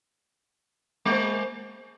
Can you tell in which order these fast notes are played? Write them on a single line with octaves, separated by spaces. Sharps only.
G#3 A#3 C5